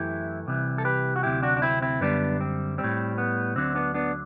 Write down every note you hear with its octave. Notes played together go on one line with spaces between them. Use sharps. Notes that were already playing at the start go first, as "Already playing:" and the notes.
Already playing: F#2 E3 A3 E4 G4
C2 C3 E3
A4
G4 B4
F#4
D2 C3 F#3 E4 G4
D4 F#4
D4
C4 E4
C4 E4
F#2 D3 G3 B3 D4
C4
G3 C4
A2
B3
D2 D3 F#3 C4
B3 D4
B3 D4